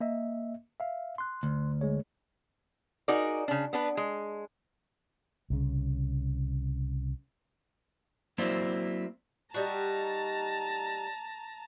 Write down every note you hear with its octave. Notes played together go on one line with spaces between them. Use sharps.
A#3 D#5 E5
E5 F5
C6 F#6
D2
G#3 G#4 C#5
D#4 F#4 G#4 A#4 D5
C#3 D4
B3 D4 B4
G#3
C2 C#3
F#3 A#3 C4 E4 C5 D5
G3 D#4 F#4 A5 A#5